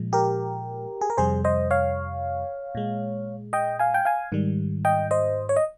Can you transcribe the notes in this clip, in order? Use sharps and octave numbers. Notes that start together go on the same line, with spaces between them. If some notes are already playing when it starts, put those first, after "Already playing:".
Already playing: A#2 F3 G#3
G4 A#4
G#4
A#4
F2 C3 G3 G#4 C5
C5 D#5
C#5 F5
A#2 G#3
D#5 G5
F5 G#5
G5
F5 G#5
G#2 D#3 G3
D#5 G5
C5 D#5
C#5
D#5